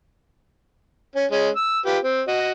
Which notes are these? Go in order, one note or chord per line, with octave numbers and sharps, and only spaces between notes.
C#4
G#3 C#4
E6
F4 G4 B4
C4
F#4 D#5